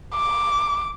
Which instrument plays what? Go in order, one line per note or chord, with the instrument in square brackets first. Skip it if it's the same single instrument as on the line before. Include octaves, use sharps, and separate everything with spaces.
[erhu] D6